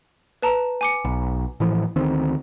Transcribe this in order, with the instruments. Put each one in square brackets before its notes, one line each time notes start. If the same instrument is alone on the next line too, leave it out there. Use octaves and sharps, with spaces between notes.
[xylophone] B4 A5 A#5
G#5 D6 C#7
[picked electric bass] B1
A2 E3 F3
D2 D#3 C4